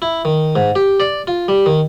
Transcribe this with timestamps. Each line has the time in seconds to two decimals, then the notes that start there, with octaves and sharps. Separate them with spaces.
0.02 E4
0.25 D#3
0.56 G#2
0.75 G4
1.00 D5
1.27 F4
1.48 G3
1.66 D#3